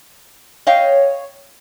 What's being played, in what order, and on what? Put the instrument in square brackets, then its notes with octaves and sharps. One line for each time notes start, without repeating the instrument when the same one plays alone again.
[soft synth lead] C#5 [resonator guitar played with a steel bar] D#5 F5 G5